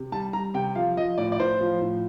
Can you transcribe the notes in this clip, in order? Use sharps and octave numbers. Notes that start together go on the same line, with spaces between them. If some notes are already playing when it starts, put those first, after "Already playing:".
Already playing: C3
G3 A5
G3 A#5
C3 G5
F3 F5
F3 D#5
A2 D5
D5
A2 C5
F3
A2